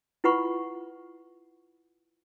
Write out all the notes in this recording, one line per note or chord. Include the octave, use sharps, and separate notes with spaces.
E4 F4 B4 F#5 B5 C#6